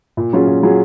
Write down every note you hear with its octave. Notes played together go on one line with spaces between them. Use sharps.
A#2
F#3 C#4 F4 G#4
A#2
F#3 C#4 F4 G#4